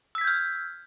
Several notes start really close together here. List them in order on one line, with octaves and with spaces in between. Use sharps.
E6 B6 G#6 G6 F6